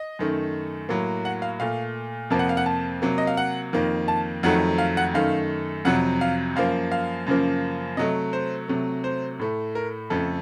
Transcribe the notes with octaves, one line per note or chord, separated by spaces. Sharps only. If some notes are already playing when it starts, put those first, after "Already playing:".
Already playing: D#5
F#2 D#3 A3
A2 F#3 A#3
F#5
F5
A#2 A3 F5
F2 C3 F3 A#3 A5
F#5
F5
F#5
A5
C3 F#3 A#3
D#5
F5
F#5
F2 D#3 A#3
A5
F2 D#3 F#3 A3 F#5
F5
F#5
F#2 D#3 A3 F5
F2 C3 F#3 F#5
F5
F#2 F3 A#3 F5
F5
F#2 C#3 F3 A#3
C3 F#3 A3 D#5
C5
C3 F#3 A3
C5
A2 A3
A#4
F2 C#3 A3 A4